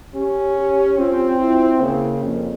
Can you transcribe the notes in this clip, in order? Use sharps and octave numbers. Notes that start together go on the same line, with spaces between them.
C#4 G4
G4
C4 F4
E4
C#3 A#3
F2